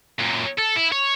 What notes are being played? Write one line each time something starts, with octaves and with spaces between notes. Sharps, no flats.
F#2 A#2
A4
E4
C#5